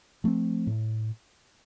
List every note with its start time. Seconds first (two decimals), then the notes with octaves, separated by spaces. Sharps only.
0.24 F3 A3 C4
0.67 A2